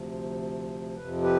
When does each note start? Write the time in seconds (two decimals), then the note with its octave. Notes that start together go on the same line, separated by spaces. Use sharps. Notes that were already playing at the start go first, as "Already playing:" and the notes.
Already playing: D2 C3 F3
0.97 F2 C3 F3 B4
1.22 G4 B4